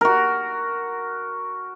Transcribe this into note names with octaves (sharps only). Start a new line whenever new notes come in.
F#4 A#4